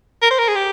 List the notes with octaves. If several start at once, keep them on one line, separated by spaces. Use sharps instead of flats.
A#4
C5
A#4
G#4
G4